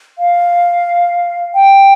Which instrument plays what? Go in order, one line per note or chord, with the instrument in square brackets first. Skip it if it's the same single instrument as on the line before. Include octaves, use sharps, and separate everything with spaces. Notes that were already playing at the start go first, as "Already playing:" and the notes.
[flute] F5
G5